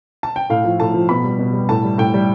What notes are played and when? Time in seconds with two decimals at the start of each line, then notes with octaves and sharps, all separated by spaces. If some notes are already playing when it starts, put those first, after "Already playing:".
0.23 A5
0.36 G5
0.50 A2 F5
0.64 F3
0.80 A2 A5
0.94 F3
1.09 B2 B5
1.24 G3
1.39 B2
1.53 G3
1.69 A2 A5
1.84 G3
1.98 A2 G5
2.14 G3